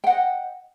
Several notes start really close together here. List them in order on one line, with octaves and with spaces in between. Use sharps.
G5 F#5 D#5